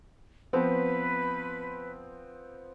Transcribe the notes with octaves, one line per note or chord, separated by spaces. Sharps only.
F3 B3 C4 B4